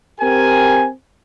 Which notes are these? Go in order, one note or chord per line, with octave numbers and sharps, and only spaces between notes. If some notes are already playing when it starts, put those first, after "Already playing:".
C4 G4 A#4 G#5